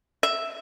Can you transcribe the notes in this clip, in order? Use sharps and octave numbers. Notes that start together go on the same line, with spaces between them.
E5